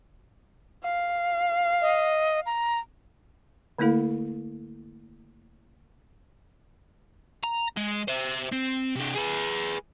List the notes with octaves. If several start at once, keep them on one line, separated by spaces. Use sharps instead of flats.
F5
D#5
A#5
D3 A3 A#3 E4 A4 F5
A#5
G#3
C5 E5
C4
C3 D4
G#4 B4